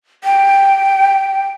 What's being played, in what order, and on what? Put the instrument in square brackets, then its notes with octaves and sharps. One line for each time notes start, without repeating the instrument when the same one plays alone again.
[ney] G5